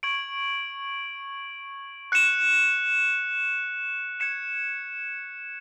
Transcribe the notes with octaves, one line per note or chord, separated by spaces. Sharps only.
C#6 G#6 D7 F#7
F#6 C#7 E7
G#6 C#7 E7